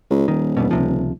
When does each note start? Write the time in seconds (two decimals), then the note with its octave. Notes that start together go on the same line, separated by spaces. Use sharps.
0.10 C#2
0.28 D#1 D#3
0.57 E2 G2 B2
0.71 C#2 C3 F3